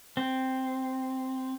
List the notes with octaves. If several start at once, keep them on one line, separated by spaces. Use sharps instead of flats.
C4